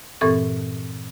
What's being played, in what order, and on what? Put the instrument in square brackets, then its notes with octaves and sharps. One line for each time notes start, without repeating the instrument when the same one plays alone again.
[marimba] G2 A#2 E3 C4 A4 C#6